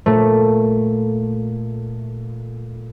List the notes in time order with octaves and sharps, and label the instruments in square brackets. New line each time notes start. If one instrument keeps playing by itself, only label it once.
[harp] A#2 A3